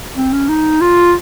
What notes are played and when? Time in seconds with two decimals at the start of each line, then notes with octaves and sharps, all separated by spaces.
0.17 C4
0.33 C#4
0.49 D#4
0.81 F4